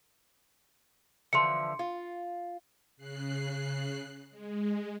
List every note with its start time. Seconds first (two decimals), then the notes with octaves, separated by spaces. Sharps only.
1.33 D3 E3 F3 C6 C#7
1.79 F4
2.97 C#3 F#6 C7
4.31 G#3